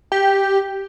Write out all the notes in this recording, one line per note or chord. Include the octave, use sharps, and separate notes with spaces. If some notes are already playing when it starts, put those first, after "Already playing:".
G4